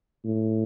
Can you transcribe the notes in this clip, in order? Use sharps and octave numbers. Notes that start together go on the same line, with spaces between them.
A2